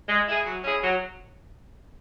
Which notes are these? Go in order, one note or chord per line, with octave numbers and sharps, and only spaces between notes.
G#3
E4 G#4
F#3
C#4 E4 G#4
F#3